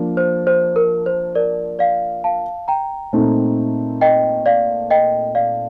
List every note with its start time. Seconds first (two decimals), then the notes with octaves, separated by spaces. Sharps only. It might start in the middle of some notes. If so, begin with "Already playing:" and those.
Already playing: F3 A#3 D4
0.17 C5
0.47 C5
0.76 A#4
1.06 C5
1.35 A#4 D5
1.79 D5 F5
2.24 F5 A5
2.68 G5 A#5
3.13 A#2 A3 C4 D#4
4.01 D#5 G5
4.46 D5 F5
4.90 D#5 G5
5.35 D5 F5